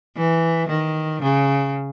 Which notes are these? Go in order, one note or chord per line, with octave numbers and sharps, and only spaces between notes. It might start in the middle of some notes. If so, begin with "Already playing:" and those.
E3
D#3
C#3